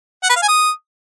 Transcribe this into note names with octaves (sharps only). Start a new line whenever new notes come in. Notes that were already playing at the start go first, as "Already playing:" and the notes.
F#5
B4
F5
G#5
D#6